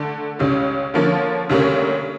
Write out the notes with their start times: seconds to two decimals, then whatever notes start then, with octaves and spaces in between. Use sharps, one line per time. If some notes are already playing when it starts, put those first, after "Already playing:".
Already playing: D3 A3 D4 A4
0.39 C#2 C#3 G3 C#4
0.94 D3 F3 A#3 C#4 F4
1.49 D2 C#3 G3 A#3 C#4